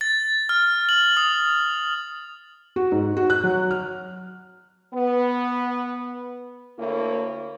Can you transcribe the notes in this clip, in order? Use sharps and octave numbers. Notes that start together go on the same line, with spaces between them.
A6
F6
F#7
D#6
F#4
G#2
F#4
F#6
F#3
F6
B3
D2 A#3 E4 C#5